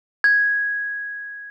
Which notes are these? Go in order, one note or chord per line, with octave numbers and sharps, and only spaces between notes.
G#6